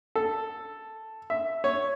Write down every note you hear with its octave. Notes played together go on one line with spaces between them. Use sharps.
A4
E5
C#5